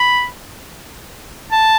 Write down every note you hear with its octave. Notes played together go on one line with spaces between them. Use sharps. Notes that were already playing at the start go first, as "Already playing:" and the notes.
Already playing: B5
A5